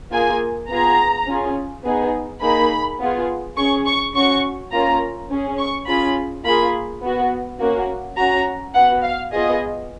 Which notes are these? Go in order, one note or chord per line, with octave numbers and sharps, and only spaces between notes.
A#3 F4 G#4 G#5
B3 F4 G#4 A#5
C#4 F4 G#4
B3 D#4 G#4
A#3 D#4 G#4 B5
B3 F4 G#4
C#4 G#4 C#6
C#6
C#4 F#4 C#6
A#3 C#4 F4 A#5
C#4 G#4
C#6
C#4 F4 G#4 B5
A#3 F4 G#4 B5
B3 F#4
A#3 C#4 F#4
C#4 F#4 A#5
B3 F#4 F#5
F5
B3 F4 G#4 D#5